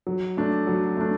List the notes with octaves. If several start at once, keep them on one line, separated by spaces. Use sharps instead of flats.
F#3
A3 D4
F#3
A3 D4